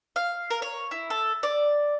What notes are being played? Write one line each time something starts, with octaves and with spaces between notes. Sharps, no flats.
F5
A#4
C#5
E4
A4
D5